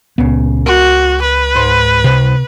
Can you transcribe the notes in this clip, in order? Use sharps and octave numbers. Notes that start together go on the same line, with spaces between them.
C#2 A#2 C#3 B3
F#4 A#4
B4
G#2 C5 C6
C2 C3 C5